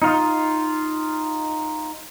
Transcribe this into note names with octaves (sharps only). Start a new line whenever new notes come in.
D#4 F4